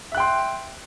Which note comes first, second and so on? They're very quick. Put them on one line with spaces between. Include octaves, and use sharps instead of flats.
E5 F#6 G5 C6